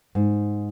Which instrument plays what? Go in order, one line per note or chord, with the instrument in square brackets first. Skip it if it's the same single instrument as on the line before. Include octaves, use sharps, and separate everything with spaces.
[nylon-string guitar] G#2